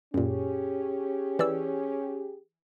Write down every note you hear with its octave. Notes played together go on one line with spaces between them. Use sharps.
F#2 A#2 C#4 G4 G#4
E3 D5 E6